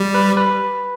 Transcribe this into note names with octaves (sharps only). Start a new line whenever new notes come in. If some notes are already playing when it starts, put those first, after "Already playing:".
Already playing: G3
B4
B4